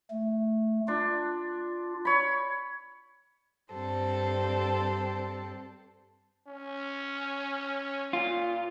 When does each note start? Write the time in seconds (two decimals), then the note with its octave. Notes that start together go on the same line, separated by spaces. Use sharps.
0.11 A3
0.88 D4 F4
2.05 C#5 B5
3.72 G2 C4 G4 A4 C5
6.48 C#4
8.13 A#2 F4